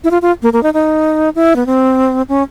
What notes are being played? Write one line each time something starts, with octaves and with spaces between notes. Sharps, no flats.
E4
F4
F4
A#3
A#3
D#4
D#4
E4
B3
C4
C#4